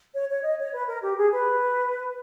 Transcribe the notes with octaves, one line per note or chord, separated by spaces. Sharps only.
C#5
C#5
D#5
C#5
B4
A#4
G4
G#4
B4